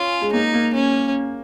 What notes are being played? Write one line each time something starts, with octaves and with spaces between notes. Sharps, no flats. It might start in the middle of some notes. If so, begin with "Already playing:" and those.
Already playing: C#4 F4
G#3
A#3 D#4
A#3
C#4